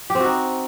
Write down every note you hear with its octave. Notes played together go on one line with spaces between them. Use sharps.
G4
C4
F#4
D#4